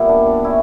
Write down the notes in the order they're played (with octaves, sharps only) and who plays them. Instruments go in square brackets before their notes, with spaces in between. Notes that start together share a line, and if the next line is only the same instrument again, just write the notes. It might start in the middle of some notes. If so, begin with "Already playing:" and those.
Already playing: [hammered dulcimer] A#2 G3 B3 E4
D4
D4
C#4 E4